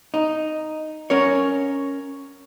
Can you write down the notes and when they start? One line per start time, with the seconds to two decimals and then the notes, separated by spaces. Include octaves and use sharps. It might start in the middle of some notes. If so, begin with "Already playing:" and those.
0.14 D#4
1.10 C#4 A#4 C#5